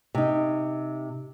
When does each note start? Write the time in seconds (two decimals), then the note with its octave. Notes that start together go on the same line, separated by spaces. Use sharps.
0.15 C3 D#4